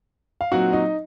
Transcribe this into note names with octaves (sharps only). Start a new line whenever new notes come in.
F5
A#2 F#3 C4 D#4 F#4 F#5
D#4 D#5